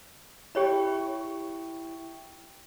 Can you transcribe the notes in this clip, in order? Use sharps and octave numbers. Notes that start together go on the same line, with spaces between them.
E4 G4 C#5 G5 B5 C#6